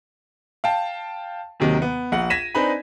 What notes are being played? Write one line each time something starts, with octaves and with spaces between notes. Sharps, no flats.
F5 G5 A5
D#2 C3 D#3 F#3
B3
A#1 F#5
G#6 A#6 B6 D#7 E7
C4 D4 D#4 B4 G#5 B5